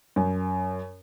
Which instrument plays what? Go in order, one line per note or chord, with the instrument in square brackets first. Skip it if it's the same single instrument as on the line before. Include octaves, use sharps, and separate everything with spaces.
[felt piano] F#2